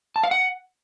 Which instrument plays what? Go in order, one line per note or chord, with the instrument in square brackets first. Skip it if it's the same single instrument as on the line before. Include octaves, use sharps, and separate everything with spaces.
[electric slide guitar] A5
F5
F#5